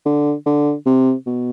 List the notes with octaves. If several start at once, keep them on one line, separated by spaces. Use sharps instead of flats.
D3
D3
C3
B2